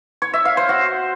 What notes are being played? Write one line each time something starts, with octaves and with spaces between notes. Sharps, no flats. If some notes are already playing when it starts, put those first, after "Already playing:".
C#5
E5
F5
C5
F#4